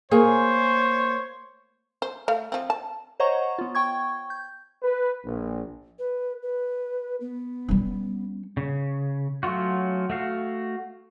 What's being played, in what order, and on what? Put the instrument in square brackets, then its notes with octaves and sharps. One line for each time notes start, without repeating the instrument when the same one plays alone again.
[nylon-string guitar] A#3 [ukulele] G#4 G#5 [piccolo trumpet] C5 [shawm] C#5
[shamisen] C5
A3 F5
F3 C4
A5
[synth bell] C5 C#5 D#5 F#5 A#5 C#6
B3 F4
G5 C#6 G#6
G6
[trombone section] B4
A#1
[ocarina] B4
B4
B3
[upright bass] G3 C#4
[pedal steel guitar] C#3
F#3 A3 C#4 F4 F#4
A3 F#4 F5